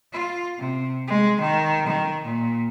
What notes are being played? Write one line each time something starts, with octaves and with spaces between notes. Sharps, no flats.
F4
C3
G#3
D#3
D#3
A#2